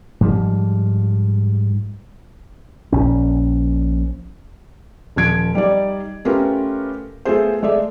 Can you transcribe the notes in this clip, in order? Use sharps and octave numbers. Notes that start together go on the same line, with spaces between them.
G#2 F3 G3
A#1 C#4
D#1 F3 G#6 D7
G3 D#4 D5
A3 C#4 F4 G4 A#4 B4
A3 B3 F4 G#4 C5
G#3 A3 D5 E5